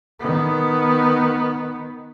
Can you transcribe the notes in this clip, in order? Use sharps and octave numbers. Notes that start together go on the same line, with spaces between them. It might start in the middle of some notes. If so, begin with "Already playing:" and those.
D#3 B3